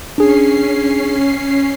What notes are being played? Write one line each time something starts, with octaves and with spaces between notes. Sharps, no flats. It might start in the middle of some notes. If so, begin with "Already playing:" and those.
C#4 D4 G#4 C7